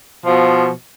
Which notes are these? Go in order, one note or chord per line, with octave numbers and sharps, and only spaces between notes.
B2 F3